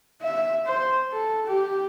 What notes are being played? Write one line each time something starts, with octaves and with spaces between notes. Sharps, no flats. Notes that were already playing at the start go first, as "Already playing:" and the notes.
E5
C5
A4
G4